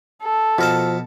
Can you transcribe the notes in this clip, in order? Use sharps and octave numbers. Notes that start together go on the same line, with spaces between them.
A4
B2 F3 A#4 A5